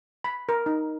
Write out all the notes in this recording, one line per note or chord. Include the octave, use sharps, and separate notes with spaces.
B5
A#4
D#4